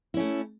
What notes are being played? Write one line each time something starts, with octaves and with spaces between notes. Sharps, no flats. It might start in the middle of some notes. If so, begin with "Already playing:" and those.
A3 C#4 E4